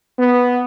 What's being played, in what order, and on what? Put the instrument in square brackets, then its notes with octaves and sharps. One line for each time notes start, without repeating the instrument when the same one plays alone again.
[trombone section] B3